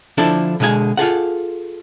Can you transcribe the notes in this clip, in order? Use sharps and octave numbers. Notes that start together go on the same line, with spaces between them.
D3 F3 D4 E4 A4
B2 D3 G#3 G#4 G#5
F4 G#4 A4 F#5